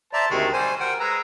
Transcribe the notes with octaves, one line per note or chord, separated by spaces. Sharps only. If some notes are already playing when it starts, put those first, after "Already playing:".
C5 D5 E5 A5 A#5
D2 C3 D#3 G#3 A3
G3 C5 G#5
A#4 C5 F#5 G5
G#3 B4 A#5 E6